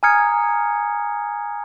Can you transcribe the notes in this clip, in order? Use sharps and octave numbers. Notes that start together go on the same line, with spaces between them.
G#5 A#5 D#6 F6 G#6 C#7